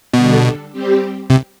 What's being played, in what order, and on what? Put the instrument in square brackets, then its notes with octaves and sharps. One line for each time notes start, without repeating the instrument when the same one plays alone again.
[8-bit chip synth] B2 [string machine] D3 G3 D4 A4
[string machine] G3 C4 G4
[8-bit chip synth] C3